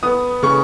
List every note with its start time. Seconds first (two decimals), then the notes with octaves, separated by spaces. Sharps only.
0.03 B3 D#6
0.43 C#3 C#6